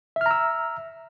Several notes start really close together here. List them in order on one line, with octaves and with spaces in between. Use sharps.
E5 F6 A#5 E6